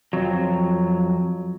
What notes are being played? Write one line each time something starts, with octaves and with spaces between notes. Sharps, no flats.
F2 F#3